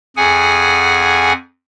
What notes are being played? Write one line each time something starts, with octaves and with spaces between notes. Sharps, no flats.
F2 G#4 F#5 G#5